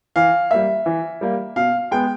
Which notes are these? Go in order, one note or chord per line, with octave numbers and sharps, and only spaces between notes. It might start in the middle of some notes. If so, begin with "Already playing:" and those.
E3 F5
G3 A#3 E5
E3
G3 A#3
B2 F5
G#3 B3 G5